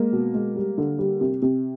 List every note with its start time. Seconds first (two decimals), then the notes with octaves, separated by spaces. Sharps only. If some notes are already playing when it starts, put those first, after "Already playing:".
Already playing: G#3 A#3
0.13 B2
0.34 G#3
0.56 G3
0.78 D3
0.99 G3
1.21 C3
1.42 C3